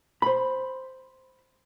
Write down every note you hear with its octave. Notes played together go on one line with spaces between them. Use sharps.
C5 B5